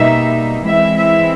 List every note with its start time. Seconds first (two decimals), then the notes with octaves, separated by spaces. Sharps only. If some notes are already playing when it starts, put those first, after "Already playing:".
Already playing: B2 G3 A#3 D#4 E5
0.69 E3 G#3 C4 E4 E5
0.97 E5